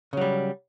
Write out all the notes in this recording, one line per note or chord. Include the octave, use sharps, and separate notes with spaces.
C#3 F#3 G3